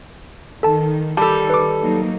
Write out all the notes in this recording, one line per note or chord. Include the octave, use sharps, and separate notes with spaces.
D#3 A4 A5
D#3 G3 A4 A5
B4 D6
F#3 A#3 D#4